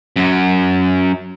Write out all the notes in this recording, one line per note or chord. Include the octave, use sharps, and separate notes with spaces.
F#2 F#3